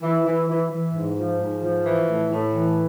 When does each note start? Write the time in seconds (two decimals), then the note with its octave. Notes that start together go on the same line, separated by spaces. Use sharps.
0.02 E3
0.25 E3
0.48 E3
0.71 E3
0.94 G#2
1.16 F3
1.40 G#2
1.63 F3
1.85 E3
2.08 A2
2.32 A2
2.54 E3